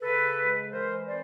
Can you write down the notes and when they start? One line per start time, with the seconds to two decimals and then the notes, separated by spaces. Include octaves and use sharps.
0.02 C#3 A4 B4
0.37 G#3
0.72 E3 A#4 C5
1.07 C4 C5 D5